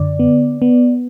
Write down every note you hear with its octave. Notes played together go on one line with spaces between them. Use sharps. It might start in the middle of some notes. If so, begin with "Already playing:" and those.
Already playing: F#2 D3 D5
B3
B3